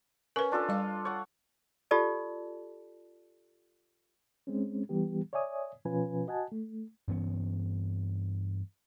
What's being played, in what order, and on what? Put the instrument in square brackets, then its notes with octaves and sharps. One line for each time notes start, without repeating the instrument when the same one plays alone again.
[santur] C#4 [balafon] A#4 B4
[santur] D4 F4 A4
[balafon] G3 F5
[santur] C#5 F#5
[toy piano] F4 G4 A4 D5 A5
[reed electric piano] G#3 C4 C#4
E3 G3 B3 G4
C#5 D5 E5 G#5 D#6
B2 F3 C#4 F4 B4 G#5
F#4 D#5 F#5 G#5 A5
A3
[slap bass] G2 E3 B3 C#4